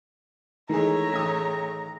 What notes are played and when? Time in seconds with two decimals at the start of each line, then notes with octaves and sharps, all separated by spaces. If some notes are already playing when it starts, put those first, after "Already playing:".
0.70 D#3 E3 G#3 A3 G#4 C#5 A#5
1.13 A1 D#6